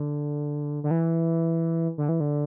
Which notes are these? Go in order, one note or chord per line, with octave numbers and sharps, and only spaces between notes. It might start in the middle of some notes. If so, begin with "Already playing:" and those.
Already playing: D3
D3
E3
D3
E3
D3